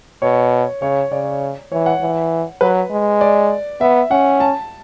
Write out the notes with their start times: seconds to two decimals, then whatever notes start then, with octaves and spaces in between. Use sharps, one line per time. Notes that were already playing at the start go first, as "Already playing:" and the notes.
0.22 B2 C#5
0.82 C#3 C#5
1.11 C#3 D5
1.72 E3 C#5
1.86 F#5
2.02 E3
2.61 F#3 B4
2.91 G#3
3.21 D5
3.81 B3 E5
4.11 C#4 F#5
4.40 A5